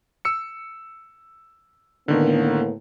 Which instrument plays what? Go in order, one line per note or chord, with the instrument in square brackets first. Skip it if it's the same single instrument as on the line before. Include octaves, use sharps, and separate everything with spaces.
[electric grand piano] E6 C#7
[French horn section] A2 A#3 B3 [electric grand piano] D3 D#3